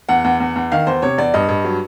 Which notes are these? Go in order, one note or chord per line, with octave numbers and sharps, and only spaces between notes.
E2 F#5
E2
E2
E2
D#3 F5
E2 C5
C3 C#5
E2 D5
G2 D#5
G2
F#3